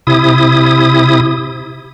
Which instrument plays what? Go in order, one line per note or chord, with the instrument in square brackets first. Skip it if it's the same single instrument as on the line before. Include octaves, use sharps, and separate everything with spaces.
[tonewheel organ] C3 E4 D#6